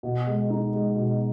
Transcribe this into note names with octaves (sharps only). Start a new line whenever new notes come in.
B2
G#3
D#4
G#3
B2